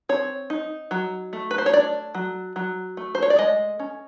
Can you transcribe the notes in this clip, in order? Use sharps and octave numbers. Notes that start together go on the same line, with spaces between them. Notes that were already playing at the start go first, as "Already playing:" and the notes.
C4 C#5
D#4
F#3
A3
B4
C5
C#5
D4 D5
F#3
F#3
A3
C5
C#5
D5
G#3 D#5
C#4